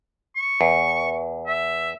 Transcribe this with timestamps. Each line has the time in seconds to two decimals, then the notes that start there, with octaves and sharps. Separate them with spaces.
0.36 C#6
0.61 E2
1.47 E5